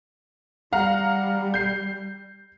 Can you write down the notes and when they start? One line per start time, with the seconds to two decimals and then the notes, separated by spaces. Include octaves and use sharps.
0.73 G3 F5 F#5 A#5
1.54 G6 C7